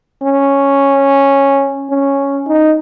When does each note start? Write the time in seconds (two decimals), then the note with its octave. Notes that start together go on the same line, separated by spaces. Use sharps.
0.22 C#4
1.90 C#4
2.47 D#4